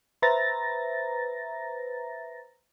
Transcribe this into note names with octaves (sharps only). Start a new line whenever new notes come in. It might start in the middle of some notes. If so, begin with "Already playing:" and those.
B4 C5 E5 A#5 A6 A#6